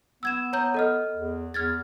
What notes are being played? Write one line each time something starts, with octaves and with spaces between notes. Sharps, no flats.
B3 E6 G#6 E7
C#5 A#5 G6
A4 D#5 F6
E2
E2 F6 G#6 A6